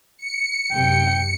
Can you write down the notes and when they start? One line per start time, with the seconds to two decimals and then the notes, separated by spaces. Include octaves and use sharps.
0.18 C#7
0.73 F#2 C3 G5